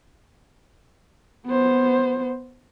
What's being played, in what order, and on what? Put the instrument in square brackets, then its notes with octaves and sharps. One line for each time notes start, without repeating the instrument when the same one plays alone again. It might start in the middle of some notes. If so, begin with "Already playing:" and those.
[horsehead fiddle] B3 C5